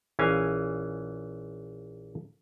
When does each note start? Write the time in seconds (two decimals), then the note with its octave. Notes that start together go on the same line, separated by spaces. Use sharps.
0.19 A#1 E3 C#4 F5 G#5